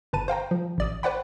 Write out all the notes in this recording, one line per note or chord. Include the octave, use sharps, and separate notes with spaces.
G1 B4 A5 D#7
C5 F5 G5 A#5
F3
A1 D5 D#6
B4 C5 D5 F#5 G5 B5